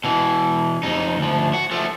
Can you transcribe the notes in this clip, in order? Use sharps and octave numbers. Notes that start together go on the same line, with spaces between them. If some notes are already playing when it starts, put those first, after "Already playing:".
B2 E3
F2 D#4
D2 F3
F#4
F3 A3